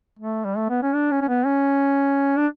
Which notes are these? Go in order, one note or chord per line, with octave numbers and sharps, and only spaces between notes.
A3
G3
A3
B3
C#4
D4
C#4
C#4
B3
C#4
D4